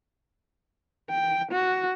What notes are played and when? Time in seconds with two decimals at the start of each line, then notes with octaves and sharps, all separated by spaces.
1.10 G5
1.52 F#4